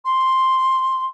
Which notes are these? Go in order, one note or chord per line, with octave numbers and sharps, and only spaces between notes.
C6